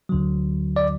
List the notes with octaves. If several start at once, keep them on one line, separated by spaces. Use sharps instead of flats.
D2 D3 F#3
D5